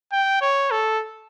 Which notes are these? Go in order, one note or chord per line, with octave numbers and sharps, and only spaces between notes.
G5
C#5
A4